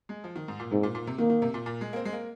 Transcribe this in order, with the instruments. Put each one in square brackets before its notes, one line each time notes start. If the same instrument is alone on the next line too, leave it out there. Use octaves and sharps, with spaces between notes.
[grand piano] G#3
F3
D#3
G#2
A#2
[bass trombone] G#2 [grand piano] C3
[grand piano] A#2
A#2
C3
[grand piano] D#3 [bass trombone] A#3
[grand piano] D#3
C3
A#2
A#2
G#3
A#3
C4
G#3
A#3